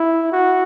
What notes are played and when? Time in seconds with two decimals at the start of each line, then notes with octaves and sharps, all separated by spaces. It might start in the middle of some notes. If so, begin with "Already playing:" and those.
Already playing: E4
0.32 F#4